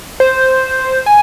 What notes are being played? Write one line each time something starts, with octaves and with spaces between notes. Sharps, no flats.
C5
G#5